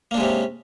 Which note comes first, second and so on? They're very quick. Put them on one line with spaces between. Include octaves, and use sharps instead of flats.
A#3 D4 G#3 C3 C#4